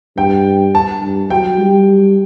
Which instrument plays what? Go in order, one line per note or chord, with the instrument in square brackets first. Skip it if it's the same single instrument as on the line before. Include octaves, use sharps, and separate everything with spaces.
[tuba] G2 [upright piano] G5
[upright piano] A5
[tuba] G2
[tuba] F#3 [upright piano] G5
[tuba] G3